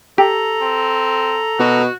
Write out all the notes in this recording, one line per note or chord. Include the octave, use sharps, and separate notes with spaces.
G4 A4 A#5
C4
B2 F#4